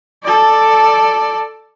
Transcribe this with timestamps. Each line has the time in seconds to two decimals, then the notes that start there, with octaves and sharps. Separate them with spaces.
0.23 A4 D5